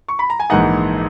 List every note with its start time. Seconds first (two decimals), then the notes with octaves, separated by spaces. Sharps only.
0.08 C#6
0.19 B5
0.30 A#5
0.40 G#5
0.50 A#1 G#2 E3 A#3 D#4 D#5 F#5